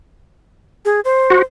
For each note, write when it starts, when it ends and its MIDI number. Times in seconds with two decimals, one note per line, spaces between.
0.85 1.00 68
1.05 1.42 72
1.30 1.42 66